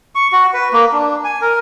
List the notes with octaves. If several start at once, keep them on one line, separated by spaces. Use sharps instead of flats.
C#6
F#4
B4
A#3
D4
G#5
A#4